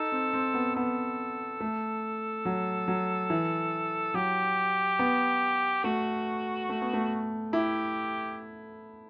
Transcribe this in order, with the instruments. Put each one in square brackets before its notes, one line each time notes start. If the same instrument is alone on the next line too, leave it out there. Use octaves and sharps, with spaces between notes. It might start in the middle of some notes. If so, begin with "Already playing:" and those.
Already playing: [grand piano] D#4 [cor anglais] A4
[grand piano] C4
C4
B3
[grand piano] B3 [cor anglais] A4
[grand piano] A3
F#3
F#3
E3
[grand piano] F#3 [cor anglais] G4
[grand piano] B3
[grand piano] A3 [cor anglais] F#4
[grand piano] A3
B3
A3
[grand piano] E4 [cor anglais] G4